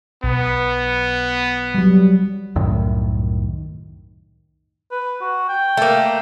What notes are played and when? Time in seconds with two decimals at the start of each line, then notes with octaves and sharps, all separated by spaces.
0.24 B1 B3
1.75 F#3 G3
2.56 C2 F#2 A2 D#3
4.91 B4
5.21 F#4
5.48 G5
5.77 A3 A#3